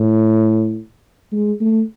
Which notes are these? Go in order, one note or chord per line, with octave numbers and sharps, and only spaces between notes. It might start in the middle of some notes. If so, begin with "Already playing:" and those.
Already playing: A2
G#3
A3